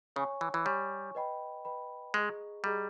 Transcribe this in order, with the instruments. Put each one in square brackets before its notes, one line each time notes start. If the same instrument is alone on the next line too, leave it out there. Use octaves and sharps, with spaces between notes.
[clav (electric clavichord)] C#3 [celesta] C#5 G#5 C#6
[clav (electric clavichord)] E3
E3
[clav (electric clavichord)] G3 [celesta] C#5 G#5 C#6
[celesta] B4 D#5 G5 B5
B4 D#5 G5 B5
[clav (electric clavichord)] G#3 [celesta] G#4 D#5 A#5 C#6
[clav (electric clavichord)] G3 [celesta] G#4 D#5 A#5 C#6